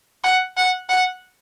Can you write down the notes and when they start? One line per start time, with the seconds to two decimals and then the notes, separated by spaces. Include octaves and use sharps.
0.24 F#5
0.57 F#5
0.89 F#5